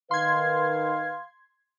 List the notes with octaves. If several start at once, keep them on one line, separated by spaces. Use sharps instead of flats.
D#3 B4 F5 C6 G#6